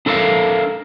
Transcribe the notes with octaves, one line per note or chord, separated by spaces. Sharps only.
D4 A4 A#4 C5 E5 F5